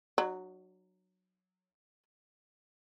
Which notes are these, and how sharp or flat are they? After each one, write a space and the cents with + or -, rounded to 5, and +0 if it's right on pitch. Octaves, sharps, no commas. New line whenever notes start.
F#3 +0 D4 +45